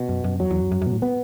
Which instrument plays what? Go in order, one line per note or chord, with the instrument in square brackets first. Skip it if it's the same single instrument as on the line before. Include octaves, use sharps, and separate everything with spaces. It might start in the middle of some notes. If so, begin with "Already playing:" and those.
Already playing: [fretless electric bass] B2
[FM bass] F#2
F#2
[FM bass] E2 [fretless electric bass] F#3
[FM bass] E2
F#2
F#2
F#2
B2
A2
[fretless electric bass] B3